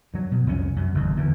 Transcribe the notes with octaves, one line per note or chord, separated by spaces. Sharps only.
G2 F#3
B2
C2 F2 C#4
F#2
F#1 D#2 G#2
E2 D3 E3